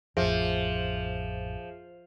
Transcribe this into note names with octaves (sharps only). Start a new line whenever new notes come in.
A1 F2 F3 G#4 E5